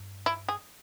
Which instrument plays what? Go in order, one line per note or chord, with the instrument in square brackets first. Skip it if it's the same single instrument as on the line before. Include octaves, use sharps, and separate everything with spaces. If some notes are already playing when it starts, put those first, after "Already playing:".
Already playing: [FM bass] G2
[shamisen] E4
G#4